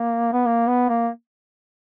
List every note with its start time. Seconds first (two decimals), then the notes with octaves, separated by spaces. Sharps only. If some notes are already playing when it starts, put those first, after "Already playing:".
Already playing: A#3
0.32 B3
0.46 A#3
0.68 B3
0.89 A#3